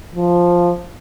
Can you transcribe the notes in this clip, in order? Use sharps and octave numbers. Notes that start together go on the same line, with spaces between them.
F3